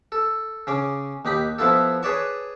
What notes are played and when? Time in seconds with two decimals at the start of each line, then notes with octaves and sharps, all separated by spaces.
0.12 A4
0.67 C#3 C#4 D6
1.25 D#2 D#4 G4 B5
1.58 F3 B3 E4 F4 A4
2.03 G#4 B4 C#5 D5 A5 C#6